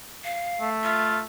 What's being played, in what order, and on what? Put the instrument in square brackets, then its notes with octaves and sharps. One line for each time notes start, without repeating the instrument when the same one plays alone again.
[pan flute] F5
[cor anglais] A3
[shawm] F4 [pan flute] E5